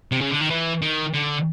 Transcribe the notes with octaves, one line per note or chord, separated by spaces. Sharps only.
C3
C#3
D3
D#3
E3
D#3
D3